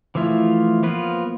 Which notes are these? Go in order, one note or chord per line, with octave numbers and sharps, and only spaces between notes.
E3 F3 A3 E4 F4
F3 A#3 B3 F4 B4